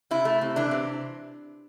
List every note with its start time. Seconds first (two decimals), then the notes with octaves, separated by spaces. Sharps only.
0.11 C3 E4
0.25 A3
0.41 C3
0.56 E3 D4
0.71 C3